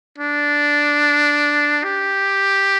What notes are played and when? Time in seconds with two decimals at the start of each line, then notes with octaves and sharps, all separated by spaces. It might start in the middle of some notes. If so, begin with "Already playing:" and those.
0.18 D4
1.84 G4